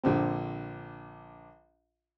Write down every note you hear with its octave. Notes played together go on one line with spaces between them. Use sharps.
A#1 D3 C4